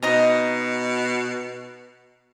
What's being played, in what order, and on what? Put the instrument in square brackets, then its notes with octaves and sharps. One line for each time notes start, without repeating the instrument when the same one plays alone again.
[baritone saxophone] B2 [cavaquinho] D#4 D#5 A#5